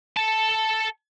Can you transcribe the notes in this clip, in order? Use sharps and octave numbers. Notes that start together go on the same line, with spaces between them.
A4 A5